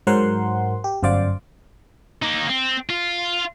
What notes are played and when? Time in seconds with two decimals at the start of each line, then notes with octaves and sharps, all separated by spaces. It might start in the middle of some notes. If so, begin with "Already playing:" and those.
0.07 G#2 F#3 A#4 C5 F#5 C6
0.84 G4
1.03 G1 F#2 C5 D5 F5 D6
2.22 A#3 D#4
2.49 C4
2.90 F4